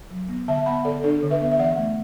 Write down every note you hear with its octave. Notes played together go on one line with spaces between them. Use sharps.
F#3
B3
D3 E5 A5
B3 F#5 B5
D3 A4 D5
D4 A4 D5
D3
B4 E5
B3
E5
E3 D5 F#5
A3